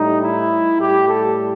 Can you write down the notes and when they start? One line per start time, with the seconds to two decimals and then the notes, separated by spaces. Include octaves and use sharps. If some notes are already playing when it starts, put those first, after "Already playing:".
Already playing: A2 G3 D#4
0.22 E4
0.79 A2 G3 G4
1.08 A4